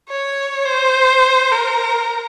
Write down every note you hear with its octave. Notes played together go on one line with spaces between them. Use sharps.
C#5
C5
A#4